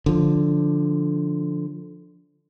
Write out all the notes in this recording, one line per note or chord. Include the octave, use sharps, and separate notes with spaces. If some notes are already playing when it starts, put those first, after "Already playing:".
D3 F3